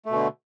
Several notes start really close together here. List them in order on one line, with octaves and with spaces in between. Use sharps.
A3 B2 D3